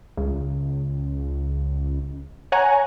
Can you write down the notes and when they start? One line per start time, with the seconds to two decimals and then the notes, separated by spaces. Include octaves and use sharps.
0.17 C#2
2.52 C#5 F#5 G#5 A#5